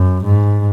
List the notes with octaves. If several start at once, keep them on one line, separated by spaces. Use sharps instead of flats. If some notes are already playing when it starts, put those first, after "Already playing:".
Already playing: F#2
G#2